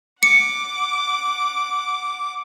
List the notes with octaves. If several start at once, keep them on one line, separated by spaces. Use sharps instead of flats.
F#5 D6 C#7